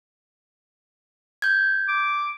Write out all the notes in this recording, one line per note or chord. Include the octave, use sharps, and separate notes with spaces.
G6 G#6
D6